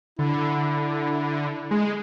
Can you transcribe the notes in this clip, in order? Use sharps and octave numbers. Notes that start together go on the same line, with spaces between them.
D3 E4
G#3